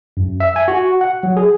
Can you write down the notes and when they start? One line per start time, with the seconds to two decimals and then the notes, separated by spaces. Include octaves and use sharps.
0.17 F#2
0.40 E5
0.56 G#5
0.68 F#4
1.01 F#5
1.23 F#3
1.37 G#4